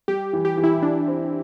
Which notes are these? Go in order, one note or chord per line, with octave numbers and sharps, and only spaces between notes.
G3 G4
E3
G4
E3
E4
D4 E4
C4